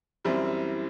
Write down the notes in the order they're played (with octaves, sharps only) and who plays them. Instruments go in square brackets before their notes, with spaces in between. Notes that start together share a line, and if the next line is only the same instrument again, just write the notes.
[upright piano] F#2 E3 G3 C4 E4